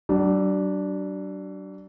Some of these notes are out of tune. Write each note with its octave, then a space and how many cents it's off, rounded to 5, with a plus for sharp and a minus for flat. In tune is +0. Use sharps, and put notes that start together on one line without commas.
F#3 +45 D4 +0